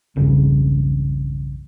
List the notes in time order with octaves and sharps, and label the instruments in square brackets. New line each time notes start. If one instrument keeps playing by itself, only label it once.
[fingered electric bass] B1 E2 G2 C#3